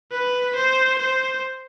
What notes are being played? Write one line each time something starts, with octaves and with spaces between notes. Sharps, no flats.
B4
C5
C5